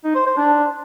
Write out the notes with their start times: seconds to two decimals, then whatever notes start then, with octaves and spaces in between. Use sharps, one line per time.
0.04 D#4
0.15 C5
0.26 C5
0.37 D4